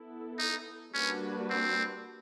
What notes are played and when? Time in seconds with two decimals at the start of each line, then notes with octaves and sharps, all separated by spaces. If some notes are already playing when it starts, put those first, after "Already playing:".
Already playing: B3 E4 A4
0.39 D#4
0.94 G3 A#3 C#4 D4 F#4 B4
1.50 C4